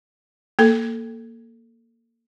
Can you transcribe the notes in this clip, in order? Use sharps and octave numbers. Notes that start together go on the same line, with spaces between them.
A#3 A4